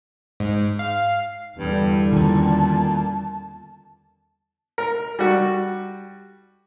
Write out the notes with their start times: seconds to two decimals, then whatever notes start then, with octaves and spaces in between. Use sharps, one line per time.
0.40 G#2
0.79 F5
1.59 E2 G2 D3 G3
2.13 A#2 D#3 C#4 A5
4.78 A#4
5.19 G3 F#4